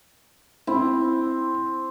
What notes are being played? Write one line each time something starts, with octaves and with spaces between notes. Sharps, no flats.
C4 E4